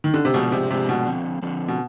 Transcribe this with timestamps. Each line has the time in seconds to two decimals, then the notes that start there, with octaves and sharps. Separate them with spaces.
0.04 D#3
0.14 D3
0.25 C3
0.34 G#2 B2 F3 G#3 D4
0.52 C3
0.70 G#2 C3 F3 G#3 D4
0.89 B2
1.07 D3 F3 C4
1.42 D3 F3 C4
1.68 B2